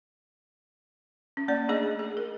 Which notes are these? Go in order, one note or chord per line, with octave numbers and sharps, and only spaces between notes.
C#4
A#3 C#4 D5
A3 D4 G#4 D#5
G#4
A#4